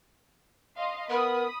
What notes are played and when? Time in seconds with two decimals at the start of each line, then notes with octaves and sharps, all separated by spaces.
0.77 D#5 F5 C6
1.10 B3 A#4 B5 D#6